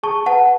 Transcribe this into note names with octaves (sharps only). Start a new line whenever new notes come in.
G#4 A5 C#6
B4 F#5 A5